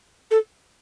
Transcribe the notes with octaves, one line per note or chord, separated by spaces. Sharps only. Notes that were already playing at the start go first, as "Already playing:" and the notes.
A4